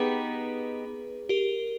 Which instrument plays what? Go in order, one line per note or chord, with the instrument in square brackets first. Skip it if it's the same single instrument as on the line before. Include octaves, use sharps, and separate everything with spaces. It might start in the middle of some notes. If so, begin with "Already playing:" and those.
Already playing: [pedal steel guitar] B3 D#4 G4 [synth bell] G#4 B4
[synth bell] G4 A#4